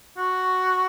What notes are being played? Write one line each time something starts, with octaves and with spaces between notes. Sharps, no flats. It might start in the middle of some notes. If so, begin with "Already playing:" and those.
F#4